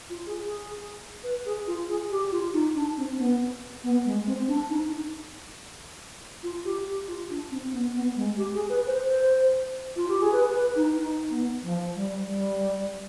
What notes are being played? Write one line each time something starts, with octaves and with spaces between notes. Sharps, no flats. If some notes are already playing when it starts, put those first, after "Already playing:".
F4
G#4
G#4
B4
G#4
F4
G#4
G4
F4
D#4
D4
C4
B3
B3
G#3
C4
D4
D#4
F4
G4
G4
F4
D4
C4
B3
B3
G#3
G4
G#4
B4
C5
C5
F4
G4
G#4
B4
B4
D#4
D#4
B3
F3
G3
G3